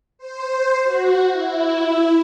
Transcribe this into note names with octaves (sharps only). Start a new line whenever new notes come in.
C5
F#4
E4